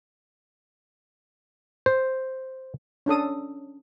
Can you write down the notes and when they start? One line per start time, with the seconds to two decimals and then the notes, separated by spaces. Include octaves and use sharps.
1.86 C5
3.06 C#4 D4 A4 D#6